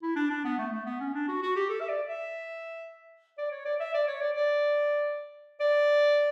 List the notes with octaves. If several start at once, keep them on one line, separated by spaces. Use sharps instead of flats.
E4
D4
D4
B3
A3
A3
B3
C#4
D4
F#4
F#4
G4
A4
E5
D5
E5
D5
C#5
D5
E5
D5
C#5
D5
D5
D5